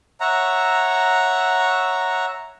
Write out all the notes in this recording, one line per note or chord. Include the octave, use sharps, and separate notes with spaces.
C#5 E5 F#5 A#5